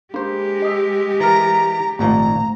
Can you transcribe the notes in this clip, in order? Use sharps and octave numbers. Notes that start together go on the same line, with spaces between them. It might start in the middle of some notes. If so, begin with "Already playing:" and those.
G#3 A#3 D4 G4 C5
D#5 D#6 E6
E3 A#4 A#5 A6 A#6 D7
G#1 A#2 F3 A3 A#5